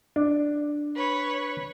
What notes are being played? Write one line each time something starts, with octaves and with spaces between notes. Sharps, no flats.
D4
B4 C#5